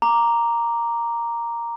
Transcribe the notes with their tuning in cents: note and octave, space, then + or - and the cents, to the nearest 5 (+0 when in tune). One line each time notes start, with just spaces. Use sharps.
A#5 +0 D6 +0